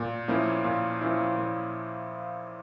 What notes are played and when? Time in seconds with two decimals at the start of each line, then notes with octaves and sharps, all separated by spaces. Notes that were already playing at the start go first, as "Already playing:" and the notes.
Already playing: A#2
0.28 F3 A#3 C#4 E4
0.64 A#2
1.01 F3 A#3 C#4 E4
1.38 A#2